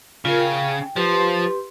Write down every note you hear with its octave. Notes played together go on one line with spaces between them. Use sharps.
C#3 F4 A#4
G5
F3 G4 B4 C6